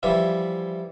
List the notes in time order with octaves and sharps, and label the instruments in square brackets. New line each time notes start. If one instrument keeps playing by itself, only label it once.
[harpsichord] E3 F3 G3 E4